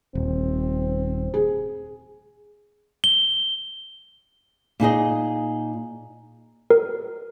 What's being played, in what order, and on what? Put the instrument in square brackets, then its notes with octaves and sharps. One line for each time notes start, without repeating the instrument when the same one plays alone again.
[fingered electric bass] D#1 [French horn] C4
[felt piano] G#4
[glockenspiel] G7
[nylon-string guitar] A#2 D#4 G#4 D#5
[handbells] A#4